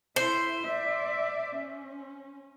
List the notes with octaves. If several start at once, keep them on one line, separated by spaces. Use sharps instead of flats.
E4 C5
D5 E5
C#4